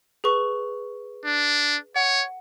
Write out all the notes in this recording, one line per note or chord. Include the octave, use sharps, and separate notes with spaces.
G#4 B4 C#6
D4
C#5 F#5